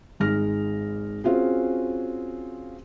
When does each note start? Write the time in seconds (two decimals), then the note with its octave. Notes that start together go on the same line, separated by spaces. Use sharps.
0.20 G#1 G#3 D#4 F6 A#6
1.24 C4 C#4 F4 F#4 G#4